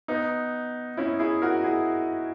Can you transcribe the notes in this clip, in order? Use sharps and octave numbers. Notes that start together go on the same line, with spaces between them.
B3 D#4
C#4 E4
E4 G#4
F#4 A#4
E4 G#4